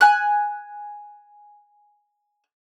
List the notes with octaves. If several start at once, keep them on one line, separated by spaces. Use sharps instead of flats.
G#5 F#6